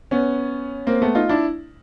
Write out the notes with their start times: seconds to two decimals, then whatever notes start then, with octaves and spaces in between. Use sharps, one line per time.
0.11 B3 C#4
0.87 A#3 C4
1.02 A3 B3
1.15 D#4 F4
1.29 D4 E4